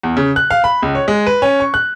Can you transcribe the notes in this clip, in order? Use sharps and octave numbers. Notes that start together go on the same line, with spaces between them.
E2
C#3
F#6
F5
B5
C#2
C#5
G#3
B4
C#4
C#6
F#6